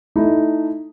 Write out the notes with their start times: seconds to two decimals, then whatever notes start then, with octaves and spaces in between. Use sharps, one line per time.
0.16 A3 D#4 E4